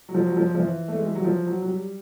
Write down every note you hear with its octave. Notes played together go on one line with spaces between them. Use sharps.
F#3
F3
F#3
F3
F3
E3
A3
G#3
G3
F#3
F3
F#3
F#3
G3